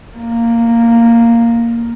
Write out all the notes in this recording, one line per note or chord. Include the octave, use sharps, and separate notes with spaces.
A#3